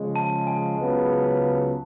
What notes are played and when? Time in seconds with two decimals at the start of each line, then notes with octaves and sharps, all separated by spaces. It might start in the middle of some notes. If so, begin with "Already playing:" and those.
Already playing: C#3 F3 G#3
0.16 A5
0.47 G#5
0.79 C#2 C#3 F#3 B3